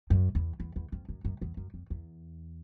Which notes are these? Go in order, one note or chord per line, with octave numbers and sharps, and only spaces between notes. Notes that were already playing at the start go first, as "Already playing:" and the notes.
F#2
E2
E2
E2
F2
F#2
F#2
E2
F#2
F2
E2